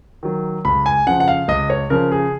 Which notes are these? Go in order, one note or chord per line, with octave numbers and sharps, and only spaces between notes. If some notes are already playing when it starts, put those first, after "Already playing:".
D#3 F#3
C#2 B5
G#5
C#3 F3 F#5
F#5
F5
C#2 D#5
C#5
C#3 F3 A#4
G#4